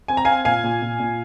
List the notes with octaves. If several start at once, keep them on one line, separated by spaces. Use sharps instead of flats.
C4 G#5
A#5
C4 F5 G#5
A#2 F5 G#5
A#2
A#2
A#2